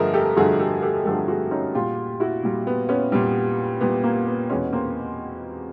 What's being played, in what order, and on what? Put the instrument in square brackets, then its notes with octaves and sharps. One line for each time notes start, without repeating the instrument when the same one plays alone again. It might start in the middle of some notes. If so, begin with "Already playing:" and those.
Already playing: [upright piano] G2 D3 F3 A3 G#4 A#4 D#5 E5
G4 A4
G2 D3 F3 A3 F#4 G#4
G4 A4
G4 A4
G2 D3 F3 A3 G4 A4
F#4 G#4
C#4 D#4
A#2 G3 F4 G4
E4 F#4
A#2 G3
B3
B3 C#4
A#2 G3
A#2 G3 B3
A#3
B3
E2 B2 G#3 B3 C#4
A#3 C4